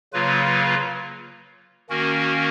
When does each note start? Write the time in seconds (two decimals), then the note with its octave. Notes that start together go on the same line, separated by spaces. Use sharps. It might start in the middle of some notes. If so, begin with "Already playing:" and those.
0.13 C#3 F#3 A#3 F4 B4
1.89 D#3 A#3 C#4 F#4 A#4